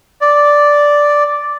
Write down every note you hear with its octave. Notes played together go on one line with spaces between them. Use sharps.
D5